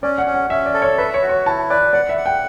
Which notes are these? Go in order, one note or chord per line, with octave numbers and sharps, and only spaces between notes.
C#4 D5
F#5
C#4
F#5
C#4 E5
D5
A4
C#5
B4 E5
C#5
F#4
C#5
E4 A5
B4 D5
D5 F#5
E5
F#5
G5